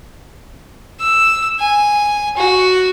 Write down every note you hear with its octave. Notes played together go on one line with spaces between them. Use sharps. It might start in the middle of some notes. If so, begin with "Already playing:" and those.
E6
G#5
F#4